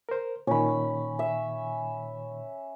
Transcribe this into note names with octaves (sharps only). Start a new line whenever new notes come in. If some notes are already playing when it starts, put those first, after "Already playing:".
A#4 C5
A#2 D#3 C#4 B5
E5